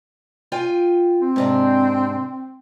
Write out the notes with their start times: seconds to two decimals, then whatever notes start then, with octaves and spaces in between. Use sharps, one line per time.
0.52 F4 G5 G#5
1.22 C4
1.36 G#2 C3 D4